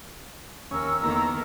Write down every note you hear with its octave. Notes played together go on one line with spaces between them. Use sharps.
D#2 C#4 A#4 E6
E2 D#3 A#3 A4 A#5